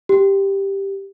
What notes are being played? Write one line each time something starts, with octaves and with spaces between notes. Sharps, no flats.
G4